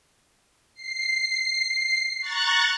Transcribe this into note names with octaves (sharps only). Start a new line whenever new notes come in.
C7
A#5 C#6 F#6 A6